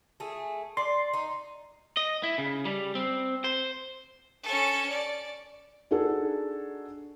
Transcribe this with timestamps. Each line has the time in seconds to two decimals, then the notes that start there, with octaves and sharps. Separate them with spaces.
0.20 A3 G#4
0.77 D5 C6
1.14 D#4
1.97 D#5
2.23 E4
2.38 C#3
2.65 G3
2.95 C4
3.44 C5
4.43 C#4 A4
4.89 D5
5.91 D4 D#4 F#4 G#4 A4